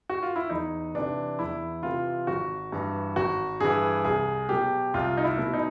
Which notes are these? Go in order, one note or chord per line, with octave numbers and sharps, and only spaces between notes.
F#4
F4
E4
E2 D#4
C3 E3 D4
E2 E4
C3 E3 F4
G#1 F#4
G2 E3
G#1 F#4
G2 E3 G#4
C2 G#4
B2 F#3 G4
C2 F4
D#4
E4
B2 F#3
D#4